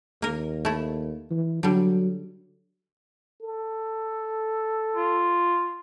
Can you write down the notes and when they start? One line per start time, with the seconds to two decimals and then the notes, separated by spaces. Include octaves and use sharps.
0.22 D#2 A#3 A#4
0.65 A3 E4
1.31 E3
1.63 D3 F#3 G3
3.42 A4
4.96 F4